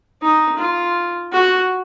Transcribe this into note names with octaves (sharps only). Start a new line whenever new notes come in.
D#4
F4
F#4